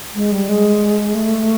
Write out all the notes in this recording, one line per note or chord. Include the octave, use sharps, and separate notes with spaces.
G#3
G3
G#3
A3